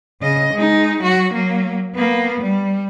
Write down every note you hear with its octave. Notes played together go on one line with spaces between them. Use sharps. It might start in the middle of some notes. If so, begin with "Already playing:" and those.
C#3 D#5
G#3 D#4
F#3 F#4
F#3 A#3
A#3 B3
G3